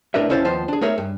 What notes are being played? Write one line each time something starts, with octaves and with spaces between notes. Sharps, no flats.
A2 D4 A#4 B4 E5
D#2 C#4 E4 C5 F5 A5
D#2 F3 B3 C5 A5
D4 G#4
A3 D#4 G#4 A#4 C#5 E5
G2